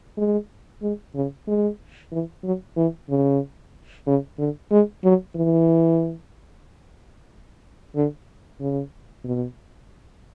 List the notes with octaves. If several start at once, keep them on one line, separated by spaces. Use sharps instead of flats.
G#3
G#3
C#3
G#3
E3
F#3
E3
C#3
C#3
D3
G#3
F#3
E3
D3
C#3
B2